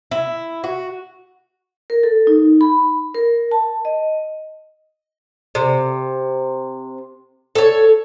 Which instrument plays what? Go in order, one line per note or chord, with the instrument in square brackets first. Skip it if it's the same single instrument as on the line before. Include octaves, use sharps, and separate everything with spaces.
[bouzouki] E4
F#4
[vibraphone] A#4
A4
D#4
B5
A#4
A5
D#5
[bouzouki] C3
A4 C#5